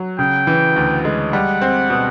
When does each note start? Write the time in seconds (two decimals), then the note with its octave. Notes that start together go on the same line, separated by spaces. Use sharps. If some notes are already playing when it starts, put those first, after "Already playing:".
Already playing: F#3
0.19 C#3 G5
0.47 E3
0.76 D2
1.05 G#3
1.33 G3 F#5
1.62 C4
1.90 B2